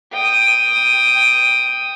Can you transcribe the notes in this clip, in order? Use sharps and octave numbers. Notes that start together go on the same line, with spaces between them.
G5 D#6